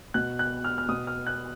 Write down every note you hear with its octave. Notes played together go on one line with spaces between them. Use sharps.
B2 F#6
F#6
F6
F6
B2 D#6
F6
F#6